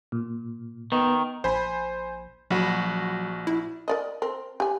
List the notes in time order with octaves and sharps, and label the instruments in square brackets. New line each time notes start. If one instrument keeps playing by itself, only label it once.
[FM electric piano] A#2
[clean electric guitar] D#3 [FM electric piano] B3
[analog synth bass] A#1 [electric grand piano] C5 G#5 B5
[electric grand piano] A#1 F#4 B5 [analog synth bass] F#3
[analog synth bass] E4
[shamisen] A#4 D5 D#5
C4 A#4
G4 G#5